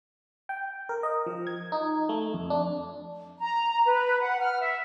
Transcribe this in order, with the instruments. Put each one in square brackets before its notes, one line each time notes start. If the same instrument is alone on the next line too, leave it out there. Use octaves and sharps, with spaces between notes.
[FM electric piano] G5
A#4
D#5
F3
G#6
D#4
A3
F2
D4
[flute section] A#5
B4
F#5
F6
E5